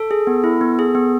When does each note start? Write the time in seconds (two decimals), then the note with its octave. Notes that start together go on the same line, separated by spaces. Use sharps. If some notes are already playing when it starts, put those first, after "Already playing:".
Already playing: A4
0.11 G#4
0.27 B3
0.44 E4
0.61 B3
0.79 G#4
0.95 B3